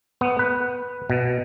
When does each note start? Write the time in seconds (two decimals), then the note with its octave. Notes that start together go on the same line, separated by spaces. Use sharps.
0.21 B3
0.39 B4
1.10 B2